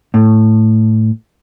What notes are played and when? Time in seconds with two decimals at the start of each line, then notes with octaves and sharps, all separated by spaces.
0.14 A2